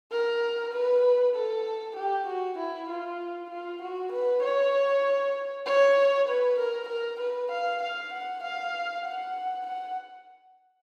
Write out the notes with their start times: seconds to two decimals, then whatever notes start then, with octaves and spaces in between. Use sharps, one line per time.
0.11 A#4
0.73 B4
1.35 A4
1.96 G4
2.27 F#4
2.57 E4
2.89 F4
3.50 F4
3.81 F#4
4.12 B4
4.43 C#5
5.65 C#5
6.28 B4
6.58 A#4
6.89 A#4
7.20 B4
7.51 F5
7.82 F5
8.13 F#5
8.43 F5
9.05 F#5
9.66 F#5